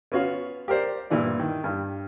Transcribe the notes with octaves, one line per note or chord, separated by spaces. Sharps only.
B3 C#4 F4 F#4 C#5 F5
G4 A#4 C5 D5
G2 A#2 E3 E4 D5
D#3
G2